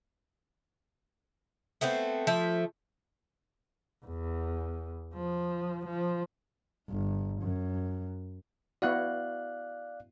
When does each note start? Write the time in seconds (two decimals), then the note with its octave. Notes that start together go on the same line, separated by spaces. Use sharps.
1.81 A3 B3 C4 C5
2.27 F3 A3 E5
4.05 E2
5.15 F3
5.86 F3
6.90 G1
7.42 F#2
8.82 B3 E4 F#4 D5 F5 F#6